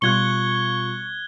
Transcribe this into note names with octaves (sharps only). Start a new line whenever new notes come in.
B2 G3 F4 C#6 F#6 G#6 G7